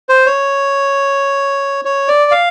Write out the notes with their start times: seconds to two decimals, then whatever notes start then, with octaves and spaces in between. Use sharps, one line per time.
0.09 C5
0.26 C#5
1.85 C#5
2.08 D5
2.31 F5